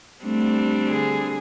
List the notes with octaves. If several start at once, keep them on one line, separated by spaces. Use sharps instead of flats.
G3 A3 C4 D4
D3 G#4